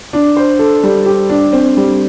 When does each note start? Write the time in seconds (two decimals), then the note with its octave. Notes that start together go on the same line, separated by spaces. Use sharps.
0.13 D4
0.36 C5
0.59 A4
0.83 G3
1.06 G4
1.29 D4
1.53 C4
1.77 G3